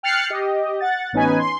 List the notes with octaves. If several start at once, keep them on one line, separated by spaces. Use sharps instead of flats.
G5 F6 F#6 A6 C7 C#7
G4 D#5
F#5 A6
A1 B3 C#4 D#4 B4 G#5
C6